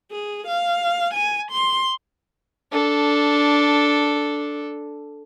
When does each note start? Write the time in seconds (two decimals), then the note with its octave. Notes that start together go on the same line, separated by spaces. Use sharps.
0.11 G#4
0.47 F5
1.15 G#5
1.52 C6
2.72 D4 A4